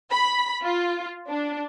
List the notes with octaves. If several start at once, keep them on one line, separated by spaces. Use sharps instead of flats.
B5
F4
D4